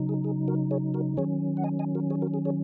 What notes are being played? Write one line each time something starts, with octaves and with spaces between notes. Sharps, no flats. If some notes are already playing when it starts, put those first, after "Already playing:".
Already playing: C#3 F#3 D#4
G#4
G#4
F#4 A#4
G#4 C#5
F#4 A#4
D#3 F#3 C#4 G#4 C#5
F#5
D#5 G#5
D#5 G#5
F#4 A#4
G#4 C#5
F#4 A#4
G#4
G#4 C#5